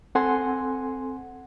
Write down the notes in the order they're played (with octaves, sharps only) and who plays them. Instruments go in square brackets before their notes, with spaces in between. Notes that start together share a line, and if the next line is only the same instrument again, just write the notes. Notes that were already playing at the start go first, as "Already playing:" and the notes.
[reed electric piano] C4 A4 F#5 G#5 C6